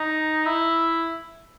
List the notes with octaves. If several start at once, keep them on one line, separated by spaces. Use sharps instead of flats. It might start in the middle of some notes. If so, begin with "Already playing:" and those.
Already playing: D#4
E4